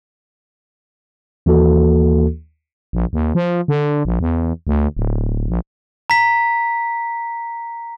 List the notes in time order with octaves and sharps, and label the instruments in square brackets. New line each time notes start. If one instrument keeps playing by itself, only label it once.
[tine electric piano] D#2 E3 A#3 F#4 A4
[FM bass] A#1
D#2
F3
D3
A#1
E2
D2
D1
A#1
[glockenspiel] A#5 B6